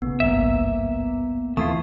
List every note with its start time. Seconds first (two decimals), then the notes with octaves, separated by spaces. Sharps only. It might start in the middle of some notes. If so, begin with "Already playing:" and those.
0.02 A1 C#3 B3
0.20 G#1 C#2 G2 A#3 E5
1.57 D#2 E3 A3 C4 E4 F4 D#6